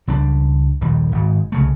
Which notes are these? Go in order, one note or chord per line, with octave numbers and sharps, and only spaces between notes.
C#2 G3 D4
D#1 A#1 D#2 G3
G#1 G#2
C2 C#3 A3